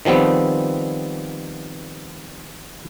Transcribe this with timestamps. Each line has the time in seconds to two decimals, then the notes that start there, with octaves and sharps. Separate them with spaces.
0.05 D#3 F3 G3 B3 C4